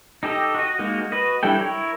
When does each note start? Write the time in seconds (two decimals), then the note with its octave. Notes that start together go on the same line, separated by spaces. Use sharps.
0.23 D#4 G4 A4 D#5
0.55 F#4 D#5
0.79 G#3 A#3 D#4 F#4
1.12 F#4 B4 D#5
1.43 G3 D4 E4 A4 G5
1.59 E4 A#4 C#5